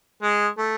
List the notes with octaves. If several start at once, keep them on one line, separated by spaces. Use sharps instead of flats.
G#3
A3